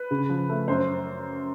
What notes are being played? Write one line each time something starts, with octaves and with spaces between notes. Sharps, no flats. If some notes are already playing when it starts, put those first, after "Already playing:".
Already playing: B4
C#3
F3
A3
F#2 C5